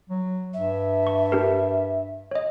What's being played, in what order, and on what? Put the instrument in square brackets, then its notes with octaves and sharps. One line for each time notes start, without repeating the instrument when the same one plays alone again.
[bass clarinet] F#3
[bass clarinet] G2 [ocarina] E5
[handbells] C#6
D4 G4 A#4
C#5 D#5